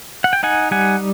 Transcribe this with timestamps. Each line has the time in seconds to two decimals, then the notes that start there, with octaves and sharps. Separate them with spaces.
0.24 F#5
0.33 G5
0.43 D#4 F#5 G#5
0.71 G3 F#5 G#5